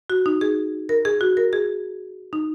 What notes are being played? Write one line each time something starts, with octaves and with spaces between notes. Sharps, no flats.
F#4
D#4
G#4
A#4
G#4
F#4
A#4
G#4
D#4